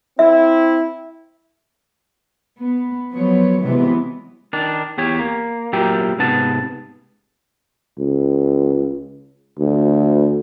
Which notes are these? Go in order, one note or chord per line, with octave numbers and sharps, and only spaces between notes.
C4 E4 E5
B3
F3 F#3 B3 C#5
C3 E3 F#3 G#3 B3
D#3 D4
E2 G4 C#5
A#3
A#2 F#3 G4 A#4 E5 G5
G#2 C3 B3 A5
C#2
D2